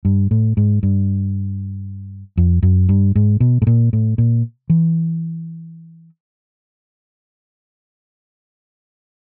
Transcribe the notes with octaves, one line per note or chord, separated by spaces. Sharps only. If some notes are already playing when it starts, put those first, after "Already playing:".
G2
A2
G#2
G2
F2
F#2
G2
G#2
B2
A2
A#2
A2
A#2
E3